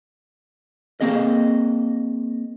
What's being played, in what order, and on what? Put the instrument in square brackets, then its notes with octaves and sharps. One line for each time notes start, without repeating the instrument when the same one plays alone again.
[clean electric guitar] A#3 C4 G#4 D#5